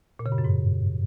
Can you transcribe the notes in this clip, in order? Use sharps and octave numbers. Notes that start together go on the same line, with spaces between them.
A#2
C#3
G2
F#2
G#2